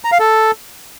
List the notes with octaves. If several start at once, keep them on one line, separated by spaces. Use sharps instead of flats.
A#5
F5
A4